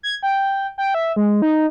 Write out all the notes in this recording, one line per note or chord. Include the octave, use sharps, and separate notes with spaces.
G#6
G5
G5
E5
G#3
D#4